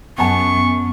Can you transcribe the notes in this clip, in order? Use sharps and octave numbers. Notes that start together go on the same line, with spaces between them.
F#2 B3 F#5 G#5 A5 C#6